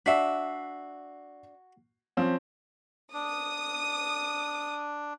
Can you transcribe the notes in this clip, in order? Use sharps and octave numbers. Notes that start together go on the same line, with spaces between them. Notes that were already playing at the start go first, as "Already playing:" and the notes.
D4 F#4 E5 B6 C7
F3 C4 C#4
D4 D#6